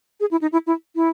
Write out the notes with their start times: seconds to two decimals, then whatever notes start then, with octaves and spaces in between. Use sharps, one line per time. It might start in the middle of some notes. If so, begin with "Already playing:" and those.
0.20 G#4
0.31 E4
0.42 D#4
0.52 E4
0.67 E4
0.96 E4